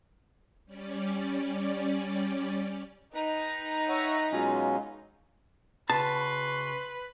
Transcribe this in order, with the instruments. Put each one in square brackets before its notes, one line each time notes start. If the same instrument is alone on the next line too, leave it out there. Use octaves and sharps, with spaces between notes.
[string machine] G3 C#4 D5
[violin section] D#4 [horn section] B4 G5 A#5
[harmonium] C#5 E5 F#5
[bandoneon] B2 F#3 C#4 [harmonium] G#3 F4
[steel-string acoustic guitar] C#3 F#4 [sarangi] B4 [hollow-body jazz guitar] A5 [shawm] C6